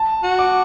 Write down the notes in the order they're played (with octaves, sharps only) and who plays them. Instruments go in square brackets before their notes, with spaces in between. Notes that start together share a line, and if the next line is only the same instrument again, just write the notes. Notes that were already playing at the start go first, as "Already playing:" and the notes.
Already playing: [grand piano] A5
[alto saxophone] F#4
[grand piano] D6